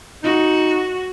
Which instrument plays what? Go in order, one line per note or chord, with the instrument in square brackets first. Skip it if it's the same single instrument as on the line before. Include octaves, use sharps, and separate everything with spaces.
[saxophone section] D#4 [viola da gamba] F#4